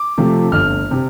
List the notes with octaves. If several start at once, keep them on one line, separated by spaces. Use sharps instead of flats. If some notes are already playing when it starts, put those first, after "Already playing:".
Already playing: D6
C3 F3 A3
G1 F6
C3